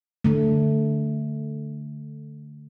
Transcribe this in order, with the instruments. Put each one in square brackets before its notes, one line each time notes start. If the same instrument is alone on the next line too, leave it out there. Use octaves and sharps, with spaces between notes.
[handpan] D3 A3